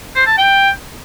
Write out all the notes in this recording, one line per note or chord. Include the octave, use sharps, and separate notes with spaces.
C5
A5
G5